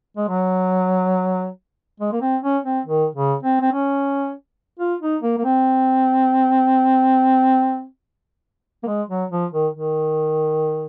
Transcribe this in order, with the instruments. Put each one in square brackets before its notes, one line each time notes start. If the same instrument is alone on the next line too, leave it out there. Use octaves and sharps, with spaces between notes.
[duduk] G#3
F#3
G#3
A#3
C4
C#4
C4
D#3
C#3
C4
C4
C#4
F4
D#4
A#3
A#3
C4
A#3
G#3
F#3
F3
D#3
D#3